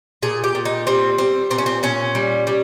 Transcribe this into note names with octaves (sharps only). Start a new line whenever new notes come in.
A#2 G#4
G4
A#2
D#4
G3 C4
G3 C4
A#2 C4
C#4
C4
A#2 C#4
G3
G3